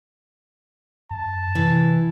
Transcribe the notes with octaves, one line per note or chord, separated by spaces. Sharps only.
F#2 A5
C3 E3